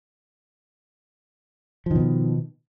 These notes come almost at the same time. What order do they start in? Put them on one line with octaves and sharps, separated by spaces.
F3 D#3 B2